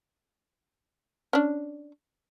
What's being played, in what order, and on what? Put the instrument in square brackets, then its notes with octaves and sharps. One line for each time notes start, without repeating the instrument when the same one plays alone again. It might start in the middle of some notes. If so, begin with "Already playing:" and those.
[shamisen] C#4 D4